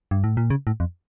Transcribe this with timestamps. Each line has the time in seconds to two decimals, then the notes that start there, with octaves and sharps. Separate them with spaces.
0.11 G2
0.24 A2
0.37 A#2
0.50 C#3
0.67 A2
0.80 F2